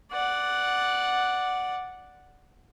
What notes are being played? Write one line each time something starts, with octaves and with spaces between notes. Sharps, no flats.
D5 F#5